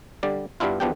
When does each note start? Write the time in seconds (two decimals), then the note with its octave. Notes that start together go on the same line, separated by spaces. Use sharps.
0.23 D3 G3 D5
0.60 G2 G3 B3 D4 E4 F4
0.80 E2 F3 B3 D4 G4 G5